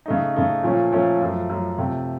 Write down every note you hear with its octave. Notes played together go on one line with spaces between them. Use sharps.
C#3 A3 D#4
C#3 A3 D#4
A#2 F3 A3 C#4
A#2 F3 A3 C#4
F#2 F3 A3
F#2 F3 A3
C3 F3 A3